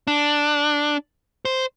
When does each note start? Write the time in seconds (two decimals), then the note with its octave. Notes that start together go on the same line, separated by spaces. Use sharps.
0.07 D4
1.45 C5